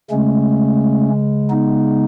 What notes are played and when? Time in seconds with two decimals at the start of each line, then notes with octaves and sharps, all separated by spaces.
0.10 C#3 G#3 A3 C#4
1.50 B3 D#4